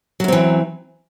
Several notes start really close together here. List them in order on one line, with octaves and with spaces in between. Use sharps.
F#3 F#2 C4 E3